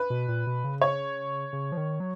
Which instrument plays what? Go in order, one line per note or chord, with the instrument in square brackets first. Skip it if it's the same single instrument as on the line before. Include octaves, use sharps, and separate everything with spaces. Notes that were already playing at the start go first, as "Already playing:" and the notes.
Already playing: [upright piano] B4
[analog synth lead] B2
A#2
B2
C#3
[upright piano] C#5
[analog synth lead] C#3
F3
D#3
F#3